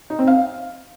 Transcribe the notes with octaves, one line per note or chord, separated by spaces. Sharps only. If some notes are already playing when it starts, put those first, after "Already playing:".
D#4
C4
F5